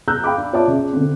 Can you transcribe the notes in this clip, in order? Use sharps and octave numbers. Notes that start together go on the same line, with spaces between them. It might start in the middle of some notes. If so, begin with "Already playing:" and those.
A#5 E6 F#6 G6
F5 G5 B5 D6
D4
F4 C#5 D5 E5 A5 D6
C#3
D3 C4